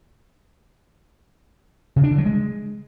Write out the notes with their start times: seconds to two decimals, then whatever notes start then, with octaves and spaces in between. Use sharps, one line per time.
1.96 C#3
2.04 D4
2.11 D3
2.18 F#3
2.26 G#3